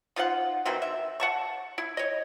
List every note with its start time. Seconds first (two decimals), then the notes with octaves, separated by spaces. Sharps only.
0.16 D#4 F4 C5 F#5
0.65 B2 D#3 E3 C4
0.82 E5
1.20 F#5 A5 C#6
1.78 E4
1.97 C#5 D#5